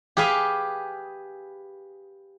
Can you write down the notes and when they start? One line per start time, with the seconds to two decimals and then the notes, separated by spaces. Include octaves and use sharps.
0.17 G4 G#4 B4 F5 G#5